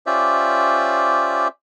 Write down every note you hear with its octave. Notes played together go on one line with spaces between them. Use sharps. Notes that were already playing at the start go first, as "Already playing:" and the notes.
C#4 F4 G4 C5 D5 E5